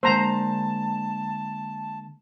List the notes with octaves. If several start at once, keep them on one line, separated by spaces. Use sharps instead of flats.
D3 G#3 A#3 C5 A5 A#5